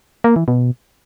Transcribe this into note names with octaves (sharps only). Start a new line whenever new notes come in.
A#3
E3
B2